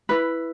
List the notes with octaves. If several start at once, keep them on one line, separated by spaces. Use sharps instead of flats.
E4 B4